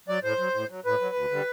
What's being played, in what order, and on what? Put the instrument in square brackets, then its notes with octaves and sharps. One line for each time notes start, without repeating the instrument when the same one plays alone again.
[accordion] F#3 D5
A2 C5
F#3
A2
F#3
A2 B4
F#3
D2
D3 G3